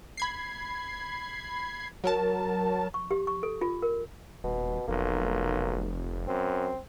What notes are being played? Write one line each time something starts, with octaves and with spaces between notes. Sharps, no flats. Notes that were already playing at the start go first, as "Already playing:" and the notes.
B5 G#6 C7
F#3 A#4 A5
C#6
G4
C#6
A4
F4
A#4
D#1 B2
F1 B1 A#3
F#2 C4